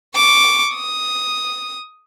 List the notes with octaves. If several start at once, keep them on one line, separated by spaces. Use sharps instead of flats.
C#6 D6
D#6